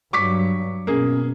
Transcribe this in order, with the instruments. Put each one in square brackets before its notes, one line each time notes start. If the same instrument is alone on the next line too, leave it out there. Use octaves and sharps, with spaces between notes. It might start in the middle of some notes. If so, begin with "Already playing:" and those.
[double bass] G2 F#3 [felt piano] C#6 D6 B6
[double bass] B2 [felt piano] A#3 G#4 [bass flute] C#4